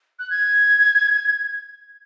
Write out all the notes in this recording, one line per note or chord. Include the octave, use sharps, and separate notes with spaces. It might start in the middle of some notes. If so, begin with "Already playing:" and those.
F#6
G#6